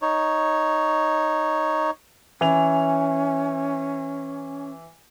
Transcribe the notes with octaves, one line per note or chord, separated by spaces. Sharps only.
D#4 C#5
E3 C#4 F7